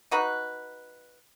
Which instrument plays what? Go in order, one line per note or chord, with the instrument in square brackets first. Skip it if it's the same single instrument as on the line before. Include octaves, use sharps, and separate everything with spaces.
[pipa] D#4 F#4 B4